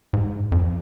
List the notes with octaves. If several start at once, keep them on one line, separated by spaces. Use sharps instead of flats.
G#2
F2